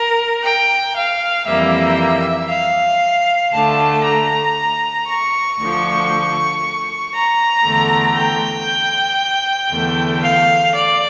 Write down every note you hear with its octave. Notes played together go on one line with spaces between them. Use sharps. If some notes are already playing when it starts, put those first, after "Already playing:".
Already playing: A#4
G5
F5
F2 E3 G3 A#3 E5
F5
D2 D3 A3 A5
A#5
C#6
D2 D3 F3
A#5
E2 D3 A3
G5
E2 D3 A3
F5
D5